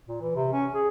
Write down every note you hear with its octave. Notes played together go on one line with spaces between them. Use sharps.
A#2
E3
C3
C#4
G#4